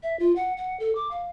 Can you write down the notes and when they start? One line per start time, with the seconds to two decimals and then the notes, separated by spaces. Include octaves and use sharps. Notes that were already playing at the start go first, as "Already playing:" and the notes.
0.03 E5
0.19 F4
0.36 F#5
0.57 F#5
0.80 A4
0.95 D6
1.11 F5